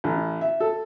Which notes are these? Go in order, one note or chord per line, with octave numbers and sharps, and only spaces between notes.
A1
E5
A4